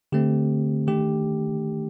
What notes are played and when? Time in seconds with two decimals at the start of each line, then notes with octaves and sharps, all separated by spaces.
0.12 D3 A3 C4 G4
0.87 D#3 A3 D4 G4